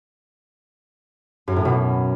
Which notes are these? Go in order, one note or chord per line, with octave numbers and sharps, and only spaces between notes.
F#2
A2
B2